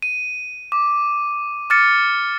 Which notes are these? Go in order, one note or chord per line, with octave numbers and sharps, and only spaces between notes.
D#7
D6
D6 F6 A6 C#7